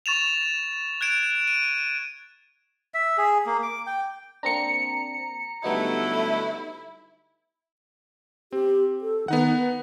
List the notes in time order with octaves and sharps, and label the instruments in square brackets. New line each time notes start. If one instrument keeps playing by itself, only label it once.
[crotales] C#6 A6 E7 F7
F#6 G#6 D7 E7
D#7
[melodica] E5
G#4
A#3
D6
G5
[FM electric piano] A#3 C4 D4 [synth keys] A#5 C#7
[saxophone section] D3 F#3 A3 [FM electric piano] G3 B3 D#4 [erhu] E4
[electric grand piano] C4 [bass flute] G4
[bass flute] A4
[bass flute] D#3 [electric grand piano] B3 D#4 F#5
[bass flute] B4